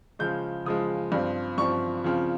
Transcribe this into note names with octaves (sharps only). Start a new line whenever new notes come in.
C#3 F3 G#3 G6
C#3 F3 G#3 D#6
G2 F3 C4
G2 F3 C4 C#6
C#3 F3 C4